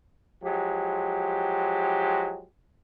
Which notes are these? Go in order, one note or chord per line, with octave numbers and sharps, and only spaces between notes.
F3 F#3 G#3 G4